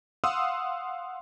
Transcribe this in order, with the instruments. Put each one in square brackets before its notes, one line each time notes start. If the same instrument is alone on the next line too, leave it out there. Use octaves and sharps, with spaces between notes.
[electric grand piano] F5 F#5 C6 D#6 E6